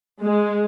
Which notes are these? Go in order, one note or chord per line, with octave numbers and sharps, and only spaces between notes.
G#3